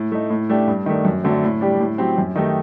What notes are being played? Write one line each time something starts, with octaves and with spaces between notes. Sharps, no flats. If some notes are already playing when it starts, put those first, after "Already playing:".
Already playing: A2
A3 D#4
A2
A3 D4 G4
G2
D#3 A3 D4
F#2
D3 F#3 A3 C4
A2
G3 D4 G4
A2
F#3 C4 G4
F#2
D#3 A3 D#4 G4